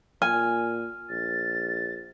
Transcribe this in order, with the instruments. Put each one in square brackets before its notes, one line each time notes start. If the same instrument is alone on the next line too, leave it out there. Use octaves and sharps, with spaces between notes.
[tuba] A#2 [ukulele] G#5 [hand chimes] F6
[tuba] A#1 [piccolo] A6